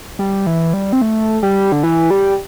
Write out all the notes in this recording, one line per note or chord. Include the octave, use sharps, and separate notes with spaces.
G3
E3
G3
C4
A3
G3
D3
E3
G3